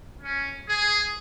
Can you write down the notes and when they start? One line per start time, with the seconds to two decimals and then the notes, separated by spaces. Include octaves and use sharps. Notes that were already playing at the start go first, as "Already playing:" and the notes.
0.22 C#4
0.69 G#4